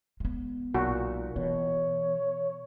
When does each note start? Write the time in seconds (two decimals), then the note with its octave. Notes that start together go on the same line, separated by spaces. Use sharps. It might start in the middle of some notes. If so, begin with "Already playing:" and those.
0.20 G#3 B3
0.74 B1 A#2 F#4
1.36 B2 E3 C#5